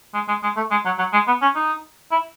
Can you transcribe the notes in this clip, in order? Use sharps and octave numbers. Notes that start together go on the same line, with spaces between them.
G#3
G#3
G#3
A3
G#3
F#3
F#3
G#3
B3
C#4
D#4
E4